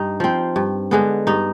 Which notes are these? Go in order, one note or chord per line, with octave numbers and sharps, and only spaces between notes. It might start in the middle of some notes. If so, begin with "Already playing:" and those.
Already playing: G2 D#4
F3 C4
G2
D3 G#3 B3
G2 D#4